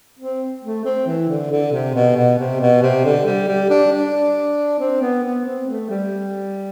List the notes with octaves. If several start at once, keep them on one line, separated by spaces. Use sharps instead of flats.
C4
A3
C4
E3
D3
D3
C3
B2
B2
C3
B2
C3
D3
G3
G3
D4
D4
C4
B3
B3
C4
A3
G3